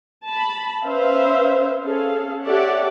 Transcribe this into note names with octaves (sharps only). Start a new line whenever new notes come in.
A5 B5
C#4 B4 C5 E5 F5
C#4 G#4 A4 F5
G4 A4 C#5 D5 E5 F#5